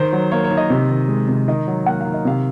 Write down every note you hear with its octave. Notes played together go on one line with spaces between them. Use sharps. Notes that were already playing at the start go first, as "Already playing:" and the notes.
Already playing: D#3 C5
F#3
A#3 C#5
C#5
D#3
D#5
C3
D#3
G#3
C3
D#3 D#5
F#3
A#3 F#5
D#3 F5
D#5
C3 F5